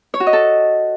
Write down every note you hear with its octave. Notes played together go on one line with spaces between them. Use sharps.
C#5
F#4
D#5
A4